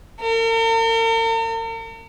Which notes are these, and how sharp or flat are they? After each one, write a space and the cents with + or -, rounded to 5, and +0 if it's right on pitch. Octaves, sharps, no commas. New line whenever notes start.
A#4 -45